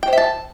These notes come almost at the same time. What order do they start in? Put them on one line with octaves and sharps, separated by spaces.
G5 C5 E5 A5